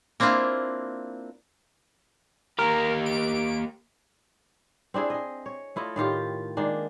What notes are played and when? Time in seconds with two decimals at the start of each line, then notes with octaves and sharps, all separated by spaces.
0.20 A#3 C4 D4 E4 F4
2.58 A#3 G4 A#4
3.06 D7
4.94 C4 D4 E4 G#4
5.10 G#4 D#5
5.46 C#5
5.76 A3 E4 F4 D#5
5.96 A2 D#3 F4 G4
6.57 D#3 G#3 A#3 D4